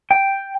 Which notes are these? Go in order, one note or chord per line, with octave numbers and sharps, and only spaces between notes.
G5